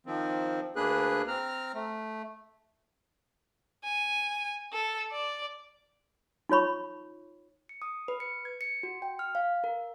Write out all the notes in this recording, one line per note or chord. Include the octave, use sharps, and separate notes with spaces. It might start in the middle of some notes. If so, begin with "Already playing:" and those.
D#3 F3 C4
D2 A#3 D4 G#4 B4 F#6
C4 A#5 F6
A3
G#5
A4
D5
D#4 F4 C#5 B5 C#6
C#7
D#6
B4
C#7
G#6
C#7
F#4
G5
F6
F5
A#4